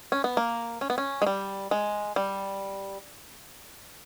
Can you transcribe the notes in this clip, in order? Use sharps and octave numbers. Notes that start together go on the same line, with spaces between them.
C#4
B3
A#3
C#4
B3
C#4
G#3
G3
G#3
G3